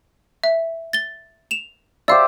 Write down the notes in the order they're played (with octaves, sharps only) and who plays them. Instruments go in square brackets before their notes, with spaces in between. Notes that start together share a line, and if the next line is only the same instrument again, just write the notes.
[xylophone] E5
A6 G7
E7 F7
[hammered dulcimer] G4 C5 E5 [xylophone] D5 F5